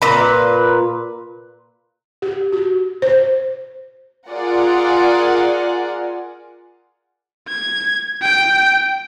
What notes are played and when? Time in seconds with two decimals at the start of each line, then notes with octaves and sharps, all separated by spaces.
0.02 A#2 B4
2.22 G4
2.52 F#4
3.02 C5
4.28 F4 G#4 A#4 D5 F#5
7.48 G#6
8.21 G5